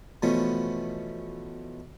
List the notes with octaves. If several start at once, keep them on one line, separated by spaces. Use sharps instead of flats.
B2 E3 F3 A3 B3 C#4